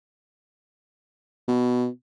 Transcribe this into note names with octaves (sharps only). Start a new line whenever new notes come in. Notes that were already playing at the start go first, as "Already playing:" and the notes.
B2